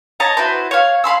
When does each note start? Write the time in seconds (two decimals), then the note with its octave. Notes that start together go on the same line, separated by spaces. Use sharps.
0.20 C#5 D#5 A5 A#5
0.37 E4 F#4 B4 C5
0.71 C#5 F5
1.04 F5 B5 C6 E6